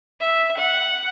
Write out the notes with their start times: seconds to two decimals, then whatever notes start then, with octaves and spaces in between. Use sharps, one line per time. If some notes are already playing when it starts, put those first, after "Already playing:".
0.20 E5
0.57 F#5